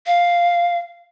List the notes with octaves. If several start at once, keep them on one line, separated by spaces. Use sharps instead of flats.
F5